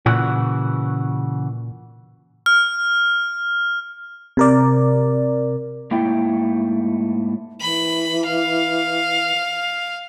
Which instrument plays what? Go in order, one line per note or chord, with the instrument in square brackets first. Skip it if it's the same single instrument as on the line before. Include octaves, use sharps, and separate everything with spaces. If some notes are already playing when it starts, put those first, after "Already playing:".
[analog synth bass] A#2 [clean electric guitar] C#3 E3 F#4
[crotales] F6
[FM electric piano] C3 A#4 D5
[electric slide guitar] G#2 A3 A#3 E4 G5
[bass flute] E3 [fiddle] B5
[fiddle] F5